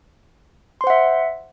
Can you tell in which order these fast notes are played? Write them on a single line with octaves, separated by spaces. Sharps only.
C6 C5 F#5 E5